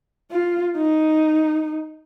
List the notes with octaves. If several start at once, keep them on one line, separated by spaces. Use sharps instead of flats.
F4
D#4